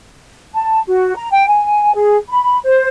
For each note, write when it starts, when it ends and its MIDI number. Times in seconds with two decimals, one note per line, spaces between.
0.54 0.80 81
0.87 1.16 66
1.17 1.28 82
1.31 1.45 79
1.47 1.93 80
1.93 2.17 68
2.28 2.59 83
2.65 2.88 72